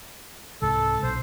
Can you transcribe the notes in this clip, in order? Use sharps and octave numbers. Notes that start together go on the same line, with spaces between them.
C2 G#2 A4
B1 C5